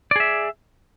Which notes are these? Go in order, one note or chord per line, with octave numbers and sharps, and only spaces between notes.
G#4 D5 E5